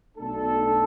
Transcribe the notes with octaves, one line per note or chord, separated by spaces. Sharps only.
B1 B2 A3 D4 A4